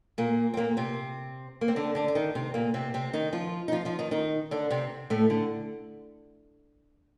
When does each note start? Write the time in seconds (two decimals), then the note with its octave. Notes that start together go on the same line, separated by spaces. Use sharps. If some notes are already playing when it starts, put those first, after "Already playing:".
0.18 A#2 A#3
0.54 C4
0.57 A#2 A#3
0.77 C3 C4
1.61 A#3
1.68 C4
1.76 D3 D4
1.95 D3 D4
2.08 D4
2.15 D#3 D#4
2.35 C3 C4
2.54 A#2 A#3
2.74 C3 C4
2.94 C3 C4
3.13 D#3 D#4
3.33 F3 F4
3.68 D#4
3.72 F3 F4
3.85 F3 F4
3.99 D#3 D#4
4.11 D#3 D#4
4.51 D3 D4
4.70 C3 C4
5.10 A2 A3
5.30 D3